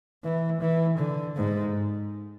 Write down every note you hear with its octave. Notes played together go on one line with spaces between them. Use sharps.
E3
E3
D3
G#2